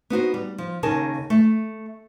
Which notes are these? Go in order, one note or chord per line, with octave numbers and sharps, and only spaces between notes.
B3 D#4 F#4 C5
G3
F3
D#2 C#3 D#4 G#4 A#4 A5
A3